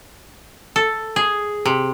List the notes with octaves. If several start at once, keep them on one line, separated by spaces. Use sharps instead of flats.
A4
G#4
C3